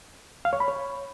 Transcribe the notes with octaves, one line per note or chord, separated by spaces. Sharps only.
F5
C#5
B5
C#5